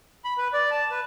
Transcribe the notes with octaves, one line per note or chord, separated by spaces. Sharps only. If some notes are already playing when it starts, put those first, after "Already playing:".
B5
B4
D5
A5
B4